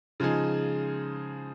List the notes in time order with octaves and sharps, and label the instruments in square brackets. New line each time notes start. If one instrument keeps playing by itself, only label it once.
[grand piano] C#3 F3 G#3 D#4 G#4